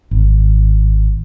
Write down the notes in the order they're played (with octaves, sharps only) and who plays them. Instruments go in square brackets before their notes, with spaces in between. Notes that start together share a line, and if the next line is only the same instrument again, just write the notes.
[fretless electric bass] G#1